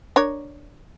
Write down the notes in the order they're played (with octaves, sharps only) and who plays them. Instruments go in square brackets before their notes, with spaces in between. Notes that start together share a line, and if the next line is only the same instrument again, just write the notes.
[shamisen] D4 A#4 C#5